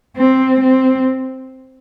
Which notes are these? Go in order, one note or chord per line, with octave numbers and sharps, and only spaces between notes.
C4
C4